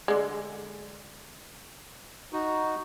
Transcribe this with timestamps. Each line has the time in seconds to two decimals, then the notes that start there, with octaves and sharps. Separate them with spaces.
0.08 D3 G#3
2.33 D#4 F#4